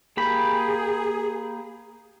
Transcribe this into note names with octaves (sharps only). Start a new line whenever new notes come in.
A#3 G4 G#4 B5